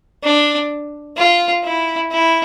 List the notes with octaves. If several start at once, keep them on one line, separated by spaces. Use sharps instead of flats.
D4
F4
E4
E4